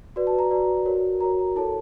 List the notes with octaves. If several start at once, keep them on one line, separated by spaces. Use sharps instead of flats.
F#4 B4 D5
A5
A#5
F#4 B4 D5
F#4 A#4 C#5
F#4 A#4 C#5 A#5
E4 A4 C#5 A5